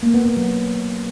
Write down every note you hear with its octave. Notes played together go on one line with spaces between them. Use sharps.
A#3
B3
B3
F#3